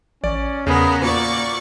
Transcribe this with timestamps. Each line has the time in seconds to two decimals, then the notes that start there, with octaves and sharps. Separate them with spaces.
0.24 A1 C#4 D5
0.67 E2 C#3 B3 G#4 A#4
1.02 A#2 A#3 F#4 D5 C#6